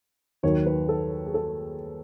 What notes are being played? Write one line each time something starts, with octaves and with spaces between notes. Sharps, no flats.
D#2 D#3 F#3 C#5
B4
A4
G#4
A4